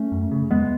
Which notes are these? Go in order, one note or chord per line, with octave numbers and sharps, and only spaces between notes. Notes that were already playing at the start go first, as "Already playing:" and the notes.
Already playing: A3 C#4
F#2
C#3
E2 G#3 B3